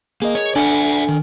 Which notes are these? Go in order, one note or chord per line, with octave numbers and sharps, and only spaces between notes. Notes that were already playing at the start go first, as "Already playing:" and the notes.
A#3 G#4 A#4 D#5
C#5
D4 A4 D5 E5 F#5 G#5
D#3